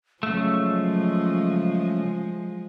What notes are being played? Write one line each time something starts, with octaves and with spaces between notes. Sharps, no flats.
C#3 F3 F#3 G#3 A3